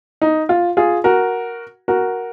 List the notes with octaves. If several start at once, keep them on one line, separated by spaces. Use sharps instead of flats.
D#4
F4
F4 G#4
F#4 A#4
F#4 A#4